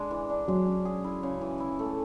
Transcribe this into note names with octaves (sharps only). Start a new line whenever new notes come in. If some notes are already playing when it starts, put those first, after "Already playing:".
Already playing: G#3 D4
E3
D4
F#3 G#3
C#4
G#4
E4
C#3
E3
E4
A3